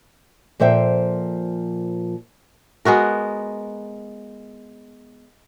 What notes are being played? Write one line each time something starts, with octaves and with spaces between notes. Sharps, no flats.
A#2 F3 A4 C5 E5 G5
G#3 B3 F#4 A#4